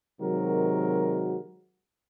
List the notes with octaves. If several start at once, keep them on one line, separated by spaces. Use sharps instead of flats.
C3 D#3 F#3 G#3 F#4 A#4